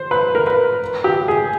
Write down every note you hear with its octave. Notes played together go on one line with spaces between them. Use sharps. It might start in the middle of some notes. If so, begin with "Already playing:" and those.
Already playing: C5
B4
A#4
B4
G4
G#4